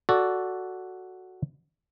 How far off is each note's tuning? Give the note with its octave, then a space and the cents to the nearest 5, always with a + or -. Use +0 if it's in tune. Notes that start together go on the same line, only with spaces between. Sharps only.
F#4 +0 A4 +0 D5 -10